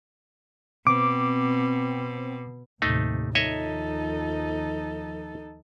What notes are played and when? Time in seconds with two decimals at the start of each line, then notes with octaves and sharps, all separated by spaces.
0.87 B2 C4 D6
2.82 D#2 A2 C3 A3 D#4
3.35 D#2 D#3 F3 D#4 A4 C#5 D#5 E5